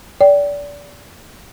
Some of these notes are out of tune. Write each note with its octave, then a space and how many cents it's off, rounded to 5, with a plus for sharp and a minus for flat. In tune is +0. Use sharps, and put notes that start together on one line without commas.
D5 -25 G5 -5